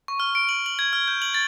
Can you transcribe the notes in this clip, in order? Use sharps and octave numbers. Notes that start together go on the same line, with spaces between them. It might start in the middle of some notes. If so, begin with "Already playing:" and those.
C#6
F6
D7
F#7
F#7
G#6
F6
G6
F#7
A6